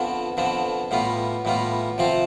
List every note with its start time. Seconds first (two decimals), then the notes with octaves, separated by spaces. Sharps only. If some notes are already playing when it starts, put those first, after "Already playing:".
Already playing: F2 D3 F3 B3
0.37 F2 D3 F3 B3
0.91 A2 G3 B3 F4
1.45 A2 G3 B3 F4
1.98 C3 F3 C4 F4